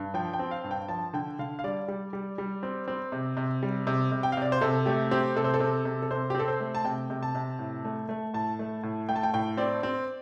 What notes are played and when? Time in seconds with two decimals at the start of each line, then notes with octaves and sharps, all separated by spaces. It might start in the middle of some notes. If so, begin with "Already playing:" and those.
Already playing: G2
0.14 F3 G5
0.33 G5
0.39 C4
0.51 F5
0.64 G2
0.71 G5
0.88 F3 A5
1.13 D3 G5
1.39 D3 F5
1.59 F5
1.64 G3 D5
1.88 G3
2.13 G3
2.38 G3
2.63 C4
2.88 C4
3.12 C3
3.37 C3
3.63 G3
3.87 C3
4.12 C3
4.23 G5
4.32 F5
4.37 C3 D5
4.52 C5
4.61 C3 A4
4.86 A3 G4
5.11 C4 G4
5.36 C3 A4
5.44 C5
5.54 A4
5.60 C3
5.85 C3
6.02 A4
6.11 C3 C5
6.30 G4
6.35 C4 A4
6.48 C5
6.60 A3
6.75 A5
6.84 C3 G5
7.10 C3
7.23 A5
7.35 C3
7.59 A2
7.85 A3
8.09 A3
8.34 A2 A5
8.59 A3
8.83 A2
9.08 A3 G5
9.16 A5
9.23 G5
9.34 A2 G5
9.57 C4 D5
9.83 C4